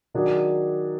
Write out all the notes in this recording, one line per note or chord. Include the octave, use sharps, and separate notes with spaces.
D#3 F#3 D4 G#4 D5